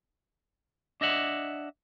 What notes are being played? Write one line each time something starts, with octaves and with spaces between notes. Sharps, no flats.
D4 D#5 E5 F#5